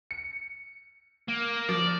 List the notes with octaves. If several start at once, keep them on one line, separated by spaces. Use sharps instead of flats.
C#7
A#3
F3 D5